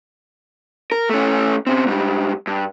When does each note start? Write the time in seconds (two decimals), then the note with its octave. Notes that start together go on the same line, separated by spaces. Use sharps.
0.92 A#4
1.10 A3 C#4
1.67 C#3 C4
1.87 G#2 G3
2.47 G2